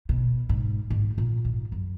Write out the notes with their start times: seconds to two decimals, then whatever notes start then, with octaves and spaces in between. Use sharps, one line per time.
0.09 B2
0.49 G#2
0.90 G#2
1.18 A#2
1.45 G#2
1.72 F#2